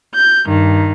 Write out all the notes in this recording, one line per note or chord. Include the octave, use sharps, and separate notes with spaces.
G6
G2 D#3